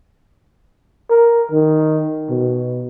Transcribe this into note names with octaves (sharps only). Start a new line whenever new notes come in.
A#4
D#3
B2